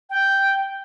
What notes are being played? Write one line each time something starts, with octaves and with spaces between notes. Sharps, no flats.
G5